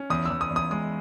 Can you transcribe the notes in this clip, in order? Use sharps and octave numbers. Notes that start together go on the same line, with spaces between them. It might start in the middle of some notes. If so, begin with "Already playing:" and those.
Already playing: C#4
E2 D#6
E2 E6
D#6
E2
D#6
G#3 D#6